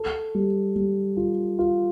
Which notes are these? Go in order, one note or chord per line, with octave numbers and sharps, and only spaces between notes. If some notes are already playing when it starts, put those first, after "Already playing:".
Already playing: A4
G3
G3
F4
F4